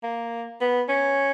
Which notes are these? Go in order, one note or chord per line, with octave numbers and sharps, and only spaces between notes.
A#3
B3
C#4